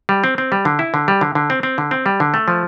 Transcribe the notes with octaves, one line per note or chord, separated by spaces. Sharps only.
G3
C4
C4
G3
D3
E4
D3
G3
D3
D3
C4
C4
D3
C4
G3
D3
A3
F3